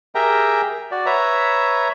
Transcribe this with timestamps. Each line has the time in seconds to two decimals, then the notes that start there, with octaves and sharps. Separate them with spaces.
0.15 G4 G#4 A#4 E5 G5 A#5
0.91 F#4 D5
1.06 B4 C#5 E5 A#5